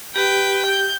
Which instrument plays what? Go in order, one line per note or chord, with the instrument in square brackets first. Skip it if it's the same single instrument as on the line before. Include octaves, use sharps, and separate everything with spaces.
[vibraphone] G4 [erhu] B4 [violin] G5
[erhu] G6